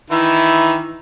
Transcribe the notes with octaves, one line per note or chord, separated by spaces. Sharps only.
D#3 E3 E4